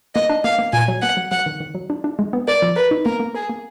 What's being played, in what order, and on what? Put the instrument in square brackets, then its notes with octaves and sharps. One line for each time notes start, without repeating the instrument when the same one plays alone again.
[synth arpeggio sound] A#3 [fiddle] D#5
[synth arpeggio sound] D4
[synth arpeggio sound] A#3 [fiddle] F5
[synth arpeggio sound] A#3
[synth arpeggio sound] A#2 [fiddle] G#5
[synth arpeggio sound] F#3
[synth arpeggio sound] A#3 [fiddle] F#5
[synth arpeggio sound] F#3
[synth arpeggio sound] F#3 [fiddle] F#5
[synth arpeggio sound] D#3
D#3
F#3
D4
D4
G#3
B3
[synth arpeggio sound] A#4 [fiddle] D5
[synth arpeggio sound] F3
[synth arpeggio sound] A#4 [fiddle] B4
[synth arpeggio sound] D#4
[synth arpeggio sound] A#3 [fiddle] A#4
[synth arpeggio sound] A#3
[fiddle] G#4 [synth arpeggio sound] A#4
[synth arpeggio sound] A#3